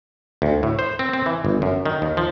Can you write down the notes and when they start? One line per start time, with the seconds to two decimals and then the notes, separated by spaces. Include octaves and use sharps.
0.42 D2
0.63 A2
0.79 C5
0.99 C4
1.13 C4
1.26 E3
1.45 G1
1.62 F#2
1.86 D#3
2.02 D#2
2.17 F3